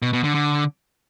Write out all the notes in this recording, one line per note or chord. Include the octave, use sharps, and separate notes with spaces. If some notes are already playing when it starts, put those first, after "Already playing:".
B2
B2
D3
D3